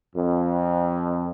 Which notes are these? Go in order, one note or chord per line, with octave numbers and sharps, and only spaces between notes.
F2